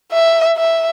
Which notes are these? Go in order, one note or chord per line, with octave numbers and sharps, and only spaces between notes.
E5
E5